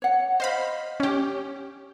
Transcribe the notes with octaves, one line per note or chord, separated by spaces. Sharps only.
C#5 F#5
C5 D#5 F5 B5
C#4 G4